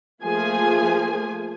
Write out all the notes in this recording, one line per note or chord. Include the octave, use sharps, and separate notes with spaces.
F3 A3 A#3 G#4 G#5